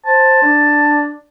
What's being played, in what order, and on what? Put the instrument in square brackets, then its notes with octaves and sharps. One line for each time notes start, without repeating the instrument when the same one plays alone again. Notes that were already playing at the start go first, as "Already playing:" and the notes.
[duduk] C5 [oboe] A5
[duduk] D4